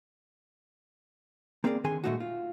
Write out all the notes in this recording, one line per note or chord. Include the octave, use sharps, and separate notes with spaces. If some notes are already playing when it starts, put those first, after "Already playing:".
A#3 C4 G#4 A#4 C#5 D5
D3 D#3 G#4 G#5 C6
A#2 C#3 G#3 A3 D#4 F#4
F4